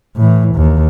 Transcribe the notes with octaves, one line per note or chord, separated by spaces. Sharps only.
A2 E3
D#2